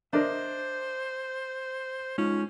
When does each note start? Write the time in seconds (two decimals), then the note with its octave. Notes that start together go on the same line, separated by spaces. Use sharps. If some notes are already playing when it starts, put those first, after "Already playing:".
0.13 D4 A#4 C5 D#5 E5
2.18 G#3 C#4 D#4 F4